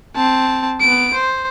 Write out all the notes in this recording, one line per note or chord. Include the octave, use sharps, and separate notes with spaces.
C4 A5
B3 D7
C5